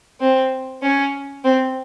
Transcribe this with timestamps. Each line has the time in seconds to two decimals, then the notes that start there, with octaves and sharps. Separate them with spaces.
0.21 C4
0.82 C#4
1.44 C4